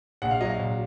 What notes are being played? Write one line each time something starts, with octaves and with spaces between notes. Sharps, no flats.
A#1 F#5
F5
F#3 D#5
F5
A#1